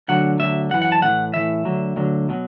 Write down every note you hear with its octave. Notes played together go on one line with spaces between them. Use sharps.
D2 D3 F#3 F#5
D2 D3 F#3 E5
F#2 E3 F#5
F#5
A5
A2 E3 F#5
A2 E3 E5
D2 D3 F#3
D2 D3 F#3
B2 F#3